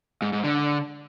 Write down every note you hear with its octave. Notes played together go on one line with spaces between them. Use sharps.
G#2
G#2
D3